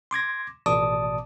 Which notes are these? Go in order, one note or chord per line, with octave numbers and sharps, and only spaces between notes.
C6 D6 G#6 A#6
A1 B2 D5 A5 D6 D#6